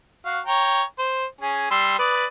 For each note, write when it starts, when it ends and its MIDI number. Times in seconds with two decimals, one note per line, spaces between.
0.26 0.40 66
0.26 0.40 77
0.46 0.83 73
0.46 0.83 79
0.46 0.83 82
0.99 1.25 72
1.41 1.70 61
1.41 1.70 68
1.71 1.96 55
1.71 1.96 84
1.71 1.96 88
1.99 2.26 71
1.99 2.26 74
1.99 2.26 87